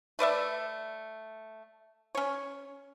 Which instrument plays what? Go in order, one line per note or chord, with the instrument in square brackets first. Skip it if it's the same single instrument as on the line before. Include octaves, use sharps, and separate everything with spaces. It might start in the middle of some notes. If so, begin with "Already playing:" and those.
[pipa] A3 B4 D5 E5
C#4 C#5